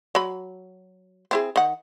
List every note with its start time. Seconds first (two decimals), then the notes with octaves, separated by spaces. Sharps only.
0.15 F#3 B5
1.31 C4 E4 G#4
1.56 D#3 F#5